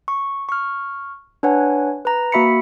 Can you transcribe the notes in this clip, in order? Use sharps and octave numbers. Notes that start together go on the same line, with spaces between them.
C#6
C#6 F6
D4 B4 C#5 F#5 G#5
B4 A#5
A#3 F#4 E5 B5 B6 C#7